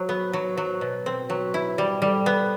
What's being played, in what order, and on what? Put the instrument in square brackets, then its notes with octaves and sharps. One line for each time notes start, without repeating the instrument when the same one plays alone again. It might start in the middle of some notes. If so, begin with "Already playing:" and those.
Already playing: [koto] F#3 [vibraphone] C5
[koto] B3 [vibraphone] B4
[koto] F#3 [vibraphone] C5
[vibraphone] C5
[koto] F#3
[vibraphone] C5
[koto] B2 [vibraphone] B4
[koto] C4
[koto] F#3 [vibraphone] B4
[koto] E4 [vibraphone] B4
[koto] G3 [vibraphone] C5
[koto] G3 [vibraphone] A4
[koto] B3